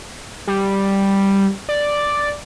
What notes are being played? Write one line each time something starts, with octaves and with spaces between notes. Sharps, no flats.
G3
D5